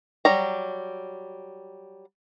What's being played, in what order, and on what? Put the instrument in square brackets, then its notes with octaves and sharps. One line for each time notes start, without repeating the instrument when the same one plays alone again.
[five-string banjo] F#3 G3 A#5